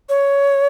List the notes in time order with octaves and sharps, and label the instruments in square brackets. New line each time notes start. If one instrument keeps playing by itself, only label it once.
[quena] C#5